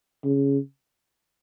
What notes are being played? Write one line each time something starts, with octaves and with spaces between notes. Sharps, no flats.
C#3